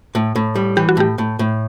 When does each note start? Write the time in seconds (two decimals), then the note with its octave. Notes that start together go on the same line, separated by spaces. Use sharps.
0.15 A2
0.36 A2
0.55 G3
0.77 E3 G4
0.89 F#4
0.97 A2 G4
1.18 A2
1.39 A2